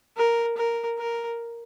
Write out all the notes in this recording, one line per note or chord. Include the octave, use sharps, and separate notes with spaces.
A#4
A#4
A#4